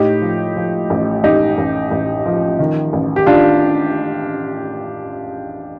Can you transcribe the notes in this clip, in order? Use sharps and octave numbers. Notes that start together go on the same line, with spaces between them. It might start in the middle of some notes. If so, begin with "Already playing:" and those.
Already playing: A2 D#4 G4
F3
F3
A1
A1 D#4 G4
A1
A1
F3
D#3
A1
G4
D#3 D4 F4